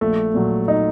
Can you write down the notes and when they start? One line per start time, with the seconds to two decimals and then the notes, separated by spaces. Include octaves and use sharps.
0.01 A#1 A3
0.34 A#2 F#3
0.68 D#4